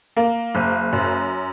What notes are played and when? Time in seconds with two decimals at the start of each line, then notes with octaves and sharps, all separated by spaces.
0.16 A#3
0.55 F#1
0.93 F#2